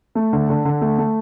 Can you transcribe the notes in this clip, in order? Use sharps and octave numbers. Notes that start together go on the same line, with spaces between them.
A3
D3
D3
D3
A3
A3